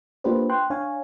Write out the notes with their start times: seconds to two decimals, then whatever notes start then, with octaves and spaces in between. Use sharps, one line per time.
0.24 A#3 D4 F4 G4 B4 C5
0.49 G5 C6 F#6
0.70 D4 C#5 F5 G#5